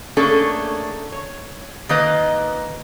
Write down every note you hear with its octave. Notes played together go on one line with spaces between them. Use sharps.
A3 A#3 C#4 D4 G#4 A4
C#5
D#3 A#3 B4 D#5